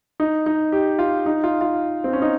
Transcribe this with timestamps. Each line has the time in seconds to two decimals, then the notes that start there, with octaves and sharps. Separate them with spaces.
0.20 D#4
0.46 D#4
0.72 G4
0.99 F4
1.26 D#4
1.44 F4
1.61 F4
2.04 C4
2.13 C#4
2.22 D#4